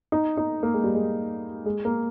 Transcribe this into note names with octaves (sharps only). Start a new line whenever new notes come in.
D#4
D#4
A#3
G#3
G3
G#3
G#3
A#3